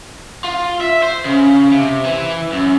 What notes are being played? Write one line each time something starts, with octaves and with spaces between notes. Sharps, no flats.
F4
E5
C5
C#3
C3
E3
F#2